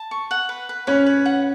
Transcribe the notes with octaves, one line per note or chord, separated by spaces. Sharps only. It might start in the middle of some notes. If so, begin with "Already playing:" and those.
Already playing: A5
C#6
F#5
B4
B4
C#4 B4 C#5
B4
F#5